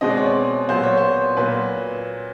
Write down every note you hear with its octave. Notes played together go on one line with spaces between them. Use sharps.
B2 G#3 C4 D#5
D5
C#5
D5
A#2 F#3 B3 C5
C#5
C5
A#2 F#3 B4